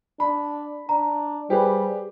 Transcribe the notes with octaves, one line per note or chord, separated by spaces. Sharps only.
D4 B5
D4 A#5
G3 G4 G#4 B4 C5